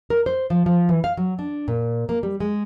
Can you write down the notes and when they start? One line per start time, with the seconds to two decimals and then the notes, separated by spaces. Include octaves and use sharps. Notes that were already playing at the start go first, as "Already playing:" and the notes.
0.10 A#4
0.26 C5
0.50 F3
0.66 F3
0.89 E3
1.04 F5
1.17 F#3
1.39 D4
1.68 A#2
2.09 A#3
2.23 G3
2.40 G#3